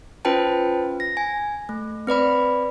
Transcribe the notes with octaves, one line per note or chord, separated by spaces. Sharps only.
C#4 F4 B4 C5 G5 A5
A#6
G#5
A3
C4 B4 D5 B5